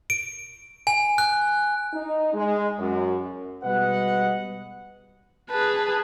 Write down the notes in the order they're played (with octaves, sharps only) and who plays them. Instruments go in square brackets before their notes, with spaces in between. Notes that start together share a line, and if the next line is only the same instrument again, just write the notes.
[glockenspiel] D7
G#5
F#6
[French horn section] D#4
G#3
F#2
[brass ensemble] B2 G3 G#3 B4 D#5 F#5
[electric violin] G#4 B4 [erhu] A5